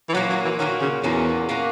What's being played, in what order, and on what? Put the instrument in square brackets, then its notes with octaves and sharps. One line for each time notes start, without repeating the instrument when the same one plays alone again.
[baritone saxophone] E3
[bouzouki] A#2 A#3 C#4 F#4 [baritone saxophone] F#3
[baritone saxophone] F#3
E3
[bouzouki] A#2 A#3 C#4 F#4 [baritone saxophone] D#3
[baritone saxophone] C#3
[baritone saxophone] E2 [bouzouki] A#2 A#3 C#4 F#4
[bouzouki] A#2 A#3 C#4 F#4